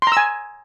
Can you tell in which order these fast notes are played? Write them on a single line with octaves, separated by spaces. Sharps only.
C6 A#5 E6 G#5